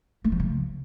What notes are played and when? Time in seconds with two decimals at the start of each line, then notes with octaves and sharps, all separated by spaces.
0.24 A3
0.32 F3
0.40 C#3